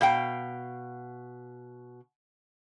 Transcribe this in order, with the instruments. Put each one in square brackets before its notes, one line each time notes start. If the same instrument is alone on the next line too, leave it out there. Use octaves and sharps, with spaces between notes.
[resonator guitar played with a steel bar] B2 F5 G5